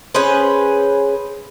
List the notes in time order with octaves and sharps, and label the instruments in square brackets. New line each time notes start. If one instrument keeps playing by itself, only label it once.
[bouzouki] C#4 G#4 B4 C5